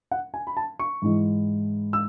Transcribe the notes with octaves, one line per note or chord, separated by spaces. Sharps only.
F#5
G#5
B5
A5
C#6
G#2 E3 G#3
E6